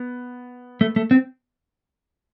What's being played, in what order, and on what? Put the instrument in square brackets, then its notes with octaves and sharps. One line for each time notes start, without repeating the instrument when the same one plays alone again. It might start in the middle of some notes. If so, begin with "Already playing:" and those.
Already playing: [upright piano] B3
[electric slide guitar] A3
A3
C4